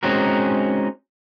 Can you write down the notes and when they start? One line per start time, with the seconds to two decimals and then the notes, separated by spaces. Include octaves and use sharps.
0.03 G#3 C4 C#4 D#4 F#4 A#4